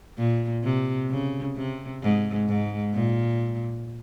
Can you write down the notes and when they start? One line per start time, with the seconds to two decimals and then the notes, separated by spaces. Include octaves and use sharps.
0.18 A#2
0.64 C3
1.10 C#3
1.56 C3
2.03 G#2
2.48 G#2
2.94 A#2